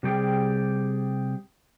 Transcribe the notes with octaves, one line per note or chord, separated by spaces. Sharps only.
C3 G3 G4 G#4 G5